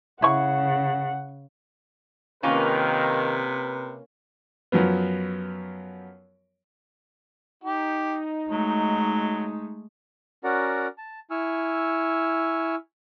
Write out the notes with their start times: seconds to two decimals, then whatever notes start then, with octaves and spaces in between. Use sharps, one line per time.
0.22 C#3 E4 F#5 C#6
2.43 C3 D#3 A#3 C#4 F4 A#4 B4
4.72 F#2 F3 F#3 B3
7.64 D#4 G4
8.49 F#3 G#3 A3
10.44 C#4 F#4 A#4 D5 F#5 A#5
10.98 A5
11.31 E4 G#5 C#6 E6 F6